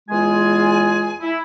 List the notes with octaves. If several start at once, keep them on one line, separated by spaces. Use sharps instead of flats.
E2 G#3 F4 G#4 G#5
E4